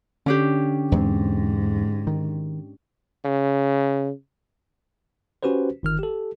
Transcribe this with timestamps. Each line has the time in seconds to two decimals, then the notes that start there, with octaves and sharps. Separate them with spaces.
0.26 D3 C#4 D4 G4
0.92 E2 G#2 G#3 C4
2.07 D#3
3.24 C#3
5.43 C#4 F#4 G4 B4 C5
5.83 G1 D#3 F6
5.99 G4 A4